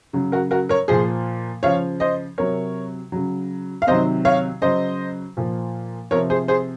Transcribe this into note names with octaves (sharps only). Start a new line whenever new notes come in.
C#3 F#3
F#4 A#4
F#4 A#4
A#4 C#5
A#2 F3 G#4 C5
C#3 F3 C#5 F5
C5 D#5
C3 F#3 A#4 C#5
C#3 F#3
F5
C3 D#3 F#3 C5 D#5
C#5 F5
C#3 F#3 C5 D#5
A#2 F3
C3 F3 A#4 C#5
G#4 C5
G#4 C5